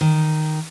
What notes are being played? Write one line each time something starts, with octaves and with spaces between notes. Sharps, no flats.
D#3